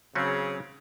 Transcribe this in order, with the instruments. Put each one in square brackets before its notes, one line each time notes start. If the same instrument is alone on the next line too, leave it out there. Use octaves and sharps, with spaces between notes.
[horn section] C#3 [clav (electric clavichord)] F#3 C4 C#4